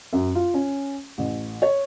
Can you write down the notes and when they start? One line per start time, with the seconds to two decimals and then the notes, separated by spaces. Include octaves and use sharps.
0.13 F#2
0.35 F4
0.54 C#4
1.18 A1
1.62 C#5